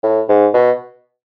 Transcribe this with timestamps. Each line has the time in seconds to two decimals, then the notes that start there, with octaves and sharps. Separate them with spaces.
0.03 A2
0.29 G#2
0.54 B2